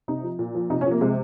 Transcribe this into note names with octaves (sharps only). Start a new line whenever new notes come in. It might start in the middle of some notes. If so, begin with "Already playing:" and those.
C3 D#4
F3
A#2
F3
C3 D#4
C#4
F3
A#3
C3 G#3